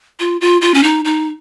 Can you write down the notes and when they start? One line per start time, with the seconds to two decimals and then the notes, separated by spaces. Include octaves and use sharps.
0.20 F4
0.41 F4
0.62 F4
0.74 C#4
0.83 D#4
1.05 D#4